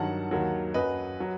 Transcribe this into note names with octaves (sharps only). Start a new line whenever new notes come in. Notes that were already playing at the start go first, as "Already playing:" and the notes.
Already playing: G2 D#3 F#3 F#5 A5
D#2 D#3 F#3
F#2 F#3 B4 D#5
F#3